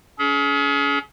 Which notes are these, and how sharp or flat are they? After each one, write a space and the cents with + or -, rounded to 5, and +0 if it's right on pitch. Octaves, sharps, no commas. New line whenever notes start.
C#4 +35 G#4 +35